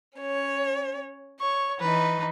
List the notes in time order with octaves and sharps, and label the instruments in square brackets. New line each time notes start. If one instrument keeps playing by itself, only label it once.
[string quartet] C#4 C#5
[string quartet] C#5 [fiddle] C#6
[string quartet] E3 D#4 [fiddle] B4